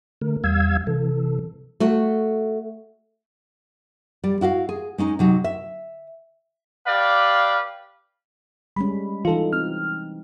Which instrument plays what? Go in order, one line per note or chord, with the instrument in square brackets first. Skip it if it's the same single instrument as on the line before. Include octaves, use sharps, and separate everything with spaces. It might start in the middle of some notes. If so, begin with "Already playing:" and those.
[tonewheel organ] D3 A3 A#4
E2 G3 F5 E6 G#6
C3 E3 A4
[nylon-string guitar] A3 F#4
G3 D5
E4 F#4 E5 F5
G#4
G#3 C#4 D#4
C3 F#3 D#4
E5
[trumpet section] G4 B4 D5 [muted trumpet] F5
[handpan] G3 G#3 C#4 [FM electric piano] B5
[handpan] E3 D#4 [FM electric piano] F4 A4
[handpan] C4 [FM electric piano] F6